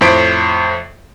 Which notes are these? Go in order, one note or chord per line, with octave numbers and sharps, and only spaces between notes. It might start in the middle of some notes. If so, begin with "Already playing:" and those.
F2 A2 C5 B6 D7